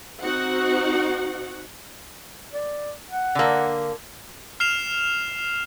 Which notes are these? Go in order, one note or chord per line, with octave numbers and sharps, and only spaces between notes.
C4 D#4 F#4 F#5
D5
F#5
D3 A#3
F6 C7 E7 F7